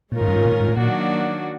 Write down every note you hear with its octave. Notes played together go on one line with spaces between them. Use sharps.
A#2 D#3 G#3 C#4 F4 A#4
G#2
G2
G#2
A#2
A2
G#2
A2
A#2 D#3 F#3 A#3 D4 F#4